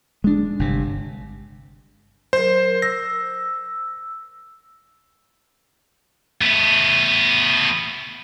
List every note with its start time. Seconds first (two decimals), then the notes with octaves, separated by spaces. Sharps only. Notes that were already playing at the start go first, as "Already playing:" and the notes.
0.24 G#3 D4
0.59 G1 C3
2.33 F#3 A#4 C5
2.82 E6 A#6
6.41 A3 B3